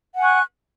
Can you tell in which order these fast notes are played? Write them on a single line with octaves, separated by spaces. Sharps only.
F#5 G#5 C#6 F#6